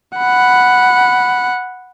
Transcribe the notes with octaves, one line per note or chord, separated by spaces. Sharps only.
F#5 B5